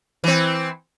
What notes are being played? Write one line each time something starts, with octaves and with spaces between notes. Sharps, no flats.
E3 C4